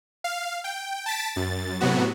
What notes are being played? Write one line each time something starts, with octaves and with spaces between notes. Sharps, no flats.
F5
G5
A5 A6 B6 D7
F#2 A6
A2 C3 F#3 B3 F#4